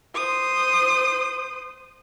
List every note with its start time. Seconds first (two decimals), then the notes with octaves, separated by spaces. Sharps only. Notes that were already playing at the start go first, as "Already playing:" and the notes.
0.15 C5 D#6